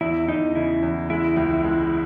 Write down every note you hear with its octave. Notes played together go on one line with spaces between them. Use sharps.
E2 E4
E2 D#4
C#3 E4
E2
G#3 E4
C#2
G#3